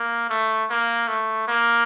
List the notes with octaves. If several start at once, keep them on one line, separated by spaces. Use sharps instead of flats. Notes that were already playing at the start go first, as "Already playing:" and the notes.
Already playing: A#3
A3
A#3
A3
A#3